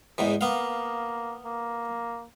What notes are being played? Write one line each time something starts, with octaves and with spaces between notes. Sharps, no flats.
E2 G#2 E3
A#3 B3 F5
A#3